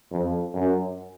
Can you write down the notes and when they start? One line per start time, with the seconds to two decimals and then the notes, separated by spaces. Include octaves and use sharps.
0.12 F2
0.54 F#2